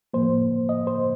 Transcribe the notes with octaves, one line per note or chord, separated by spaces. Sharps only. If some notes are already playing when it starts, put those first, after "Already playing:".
A2 F3 A#3 C5
D#5
C5